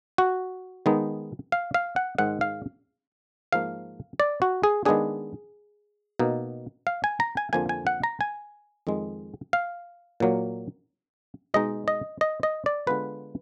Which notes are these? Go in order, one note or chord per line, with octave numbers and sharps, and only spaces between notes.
F#4
D#3 G#3 B3 D#4
F5
F5
F#5
G#2 D#3 G#3 F#5
F5
G#2 F3 A#3 F5
D5
F#4
G#4
D#3 G#3 B3 D4 G#4
B2 A#3 D#4
F5
G#5
A#5
G#5
F2 D3 F3 A#3 G#5
G#5
F#5
A#5
G#5
F2 D#3 G#3
F5
A#2 F#3 A#3
B2 G#3 D#4 D#5
D#5
D#5
D#5
D5
D3 G#3 B3 F4 B4